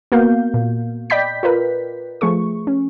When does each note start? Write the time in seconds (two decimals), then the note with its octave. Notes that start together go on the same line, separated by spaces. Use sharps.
0.12 A#3 B3 F#4 A#4 F5 G6
0.54 A#2
1.10 D5 D#5 G5 B5 G6 B6
1.43 F4 A#4 B4
2.21 F3 A3 G#4 C#6
2.67 C#4